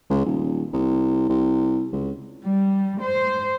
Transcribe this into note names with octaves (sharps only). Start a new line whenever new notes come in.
C#2
D#1
C2
C2
C#2
G3
C5